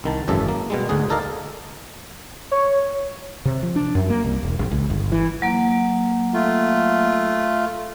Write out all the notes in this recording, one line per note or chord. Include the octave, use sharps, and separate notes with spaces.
C2 D#3 A5
G#1 F#2 C#3 E3 A4 E5
A#3
B2 G3 G#3
D2 G#2 D3 G#4
D#4 A4 A#4 D5 D#5 F5
C#5
C3
F3
D4
F#2
A#3
C2
E1
A#1
C#2
G1
E3
F#3 A#3
A3 F4